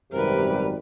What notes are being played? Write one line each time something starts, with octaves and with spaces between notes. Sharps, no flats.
G#1 F#2 C3 G3 A#4 B4